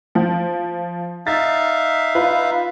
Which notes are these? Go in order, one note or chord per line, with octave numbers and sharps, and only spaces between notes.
F3
D#4 E5 F5 A6
F4 B4